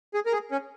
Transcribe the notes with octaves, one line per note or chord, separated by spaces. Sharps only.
G#4
A#4
G#4
C#4